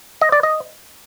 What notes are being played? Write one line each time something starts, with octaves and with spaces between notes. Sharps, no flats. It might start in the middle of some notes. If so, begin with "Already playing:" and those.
D#5
D5
D#5